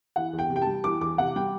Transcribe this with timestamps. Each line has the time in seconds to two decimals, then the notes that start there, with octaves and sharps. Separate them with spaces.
0.16 E3 F#5
0.33 E2
0.39 G5
0.50 C3
0.56 G5
0.62 A5
0.67 G3
0.84 E3 D6
1.01 E2 D6
1.18 C3 F#5
1.36 G3 G5